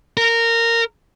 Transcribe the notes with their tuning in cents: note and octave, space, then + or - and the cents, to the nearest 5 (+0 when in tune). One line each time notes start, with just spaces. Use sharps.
A#4 -15